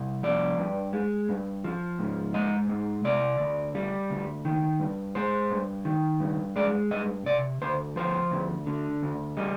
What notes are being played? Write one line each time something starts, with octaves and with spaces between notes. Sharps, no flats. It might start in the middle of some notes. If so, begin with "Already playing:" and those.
Already playing: C2
F3 D5
G2
G#3
G2
F3
G#2
G#3 D#5
G#2
C3 D5
D2
G3
D2
D#3
G2
G#3 C5
G2
D#3
G2
G#3 D5
G2 D#5
C3 D5
D2 C5
F3 C5
D2
D3
D2
G3 D#5